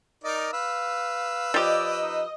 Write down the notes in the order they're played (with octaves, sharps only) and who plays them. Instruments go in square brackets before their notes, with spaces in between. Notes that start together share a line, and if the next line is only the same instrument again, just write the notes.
[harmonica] D#4 A#4 D5 [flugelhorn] D#5
[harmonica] B4 E6 [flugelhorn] F5
[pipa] F3 G4 [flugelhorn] D5 [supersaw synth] D#5
[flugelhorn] D#4